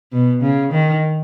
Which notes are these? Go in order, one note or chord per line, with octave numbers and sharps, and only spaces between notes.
B2
C#3
D#3